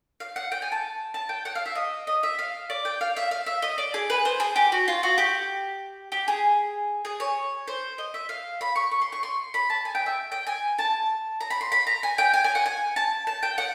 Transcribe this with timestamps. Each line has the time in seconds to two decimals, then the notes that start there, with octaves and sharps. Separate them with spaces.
0.20 F5
0.36 F#5
0.52 G5
0.62 G#5
0.72 A5
1.14 A5
1.29 G5
1.45 F#5
1.55 F5
1.66 E5
1.75 D#5
2.07 D#5
2.23 E5
2.39 F5
2.70 D5
2.85 G5
3.01 F5
3.16 E5
3.31 F5
3.46 E5
3.62 D#5
3.78 D5
3.94 G#4
4.10 B4
4.25 C5
4.40 G#4
4.56 G4
4.72 F#4
4.88 F4
5.03 F#4
5.18 G4
6.12 G4
6.28 G#4
7.05 G#4
7.20 C#5
7.68 C5
7.98 D#5
8.14 E5
8.29 F5
8.61 B5
8.76 C#6
8.91 C#6
9.02 C6
9.12 C#6
9.23 C6
9.54 B5
9.70 A5
9.85 G#5
9.95 G5
10.06 E5
10.32 G5
10.47 G#5
10.78 A5
11.41 A#5
11.50 B5
11.61 C6
11.72 B5
11.87 A#5
12.03 G#5
12.18 G5
12.34 G#5
12.44 G#5
12.55 F#5
12.66 G#5
12.96 A5
13.27 A5
13.43 G5
13.58 F#5